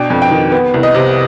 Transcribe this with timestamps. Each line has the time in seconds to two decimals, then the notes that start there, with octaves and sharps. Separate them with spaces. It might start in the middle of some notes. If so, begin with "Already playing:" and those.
Already playing: B2 D4 G5
0.10 F2
0.22 G5
0.31 D#3
0.52 B3
0.74 C2
0.83 D#5
0.94 C3